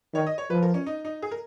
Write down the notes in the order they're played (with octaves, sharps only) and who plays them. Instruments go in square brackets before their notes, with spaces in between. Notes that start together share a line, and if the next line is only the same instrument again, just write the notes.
[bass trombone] D#3 [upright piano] C#5
[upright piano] D#5
C#5
[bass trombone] F3 [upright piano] B4
[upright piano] A#4
C#4
D#4
D#4
G#4
A#4